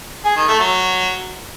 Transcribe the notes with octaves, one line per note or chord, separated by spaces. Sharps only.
G#4
D#3
A3
F#3